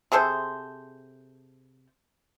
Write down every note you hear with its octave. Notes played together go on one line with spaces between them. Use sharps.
C3 G#4 A4 C5